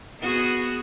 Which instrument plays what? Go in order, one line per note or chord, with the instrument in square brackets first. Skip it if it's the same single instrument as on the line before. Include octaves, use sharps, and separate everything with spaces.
[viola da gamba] B3 F#4 G#4